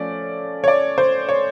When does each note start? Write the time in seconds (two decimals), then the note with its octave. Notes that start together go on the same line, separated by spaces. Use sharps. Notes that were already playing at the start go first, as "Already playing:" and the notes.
Already playing: F3 A3 C#4 D5
0.64 C#5
0.68 D5
0.98 C5
1.29 C#5